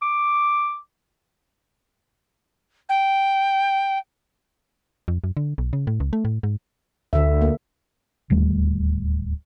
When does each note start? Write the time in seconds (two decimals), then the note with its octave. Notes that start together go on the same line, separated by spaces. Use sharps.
0.02 D6
2.89 G5
5.08 F2
5.24 F#2
5.37 D3
5.58 B1
5.73 C#3
5.87 A2
6.00 C#2
6.13 A3
6.25 A2
6.43 G#2
7.13 D2 D3 E5
7.42 A#3
8.30 D1 D#2 G3 A3